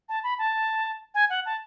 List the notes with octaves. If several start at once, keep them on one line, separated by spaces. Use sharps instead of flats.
A5
B5
A5
G#5
F#5
A5